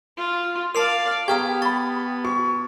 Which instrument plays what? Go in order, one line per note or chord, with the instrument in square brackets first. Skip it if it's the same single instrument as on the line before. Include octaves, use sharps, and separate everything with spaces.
[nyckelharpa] F4
[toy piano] A#4 [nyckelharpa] D5 F5 [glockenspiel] A5 C7 F7
[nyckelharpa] B3 [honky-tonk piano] G4 [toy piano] F5 A#5 C#6 [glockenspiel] D#6 F6 G#6
[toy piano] B5 C#6 [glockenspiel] A6
[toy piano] F#4 [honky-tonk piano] C#6